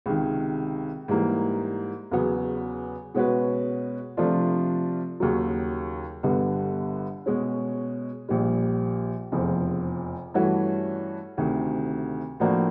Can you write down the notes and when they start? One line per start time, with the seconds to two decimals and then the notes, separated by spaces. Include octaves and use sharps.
0.06 C#2 C3 D#3
1.08 G#2 E3 G3 A#3
2.11 E2 C#3 F#3 B3
3.15 B2 G#3 C#4 F#4 B4
4.17 C3 F3 A3 D4 F4
5.20 D#2 C#3 F#3
6.23 G1 G2 D3 G3 B3
7.26 B2 G#3 C#4
8.29 A#1 A#2 G3
9.32 F1 E2 C#3 F3
10.34 G2 E3 A3 C#4 F#4
11.38 D2 C3 D#3
12.40 A2 F3 A#3 D4 F#4